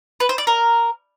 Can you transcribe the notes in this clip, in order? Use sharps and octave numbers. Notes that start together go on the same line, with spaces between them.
B4
C5
D5
A#4